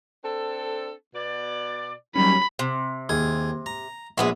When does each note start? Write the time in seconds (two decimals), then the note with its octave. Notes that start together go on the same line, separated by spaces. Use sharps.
0.24 C4 D4 A4
1.15 B2 D5
2.16 D#2 F#3 G3 C#4 B5
2.59 C3
3.09 D#2 G#4
3.66 A#5
4.18 A#1 G#3 B3 E4